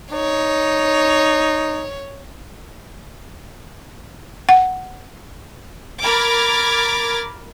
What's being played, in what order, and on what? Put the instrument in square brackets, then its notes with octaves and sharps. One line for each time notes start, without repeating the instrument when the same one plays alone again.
[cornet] D#4 [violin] C#5
[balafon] F#5
[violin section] A#4 B5 D6 F6 G#6 A6